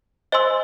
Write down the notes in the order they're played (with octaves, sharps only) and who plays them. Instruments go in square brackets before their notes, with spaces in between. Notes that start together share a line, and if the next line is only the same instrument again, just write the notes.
[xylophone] C5 D#5 G#5 C6 E6